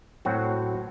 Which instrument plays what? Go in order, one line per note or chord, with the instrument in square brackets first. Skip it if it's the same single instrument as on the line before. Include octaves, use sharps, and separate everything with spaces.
[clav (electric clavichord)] A2 F#3 C4 F#4